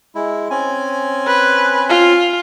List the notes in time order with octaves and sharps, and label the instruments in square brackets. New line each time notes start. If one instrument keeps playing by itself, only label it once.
[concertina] G#3 E4
C4 C#4 G#5
[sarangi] B4
F4